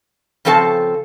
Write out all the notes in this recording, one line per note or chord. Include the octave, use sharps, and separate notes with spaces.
C#3 F3 C4 A4 B4 A5